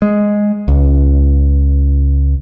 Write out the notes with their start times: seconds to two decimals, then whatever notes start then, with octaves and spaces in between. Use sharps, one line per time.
0.02 G#3
0.68 C#2